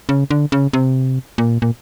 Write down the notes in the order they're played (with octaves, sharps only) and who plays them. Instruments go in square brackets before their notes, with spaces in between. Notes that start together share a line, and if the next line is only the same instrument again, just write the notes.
[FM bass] C#3
D3
C#3
C3
A#2
A#2